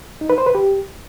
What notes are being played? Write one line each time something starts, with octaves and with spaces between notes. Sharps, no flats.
D#4
B4
C5
B4
G4